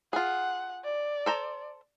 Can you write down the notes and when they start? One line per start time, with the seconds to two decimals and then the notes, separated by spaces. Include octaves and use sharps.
0.13 F4 G#4 F#5
0.84 D5
1.26 A4 C5 A#5